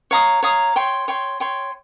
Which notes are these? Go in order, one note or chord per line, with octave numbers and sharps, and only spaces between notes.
C#5 F5 A#5 D#6
C#5 F5 A#5 D#6
C#5 G5 C6
C#5 G5 C6
C#5 G5 C6